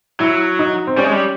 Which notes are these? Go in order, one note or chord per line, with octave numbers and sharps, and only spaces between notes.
F#3 E4
D#4
C4
G3 C#4
G#3
G3